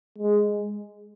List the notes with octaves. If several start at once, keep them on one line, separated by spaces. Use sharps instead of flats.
G#3